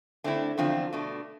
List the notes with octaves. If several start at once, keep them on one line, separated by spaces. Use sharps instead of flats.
D3 A3 C4 E4
E2 D3 F3 C4 F4
B2 A3 D4